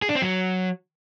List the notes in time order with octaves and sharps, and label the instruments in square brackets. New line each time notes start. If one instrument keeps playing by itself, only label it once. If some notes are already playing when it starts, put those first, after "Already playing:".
[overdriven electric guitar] G#4
D4
C4
F#3